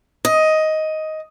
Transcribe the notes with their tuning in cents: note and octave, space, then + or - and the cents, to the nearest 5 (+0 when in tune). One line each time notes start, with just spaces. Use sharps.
D#5 +10